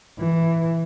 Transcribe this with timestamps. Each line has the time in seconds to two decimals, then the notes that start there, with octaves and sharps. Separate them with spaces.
0.19 E3